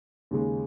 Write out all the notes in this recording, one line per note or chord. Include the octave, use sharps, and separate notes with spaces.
D#2 C#3 G#3